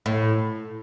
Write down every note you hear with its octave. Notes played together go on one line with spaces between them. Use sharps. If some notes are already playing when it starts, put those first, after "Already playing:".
A2